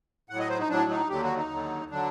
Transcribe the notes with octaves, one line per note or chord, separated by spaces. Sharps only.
A2 F#3 F#5
D#5
C5
D#4
A2 F#3 D4
D#4
D#2 D3 F#3 G4
F#4
D#4
D#2 D3 F#3
D3 F#3 D4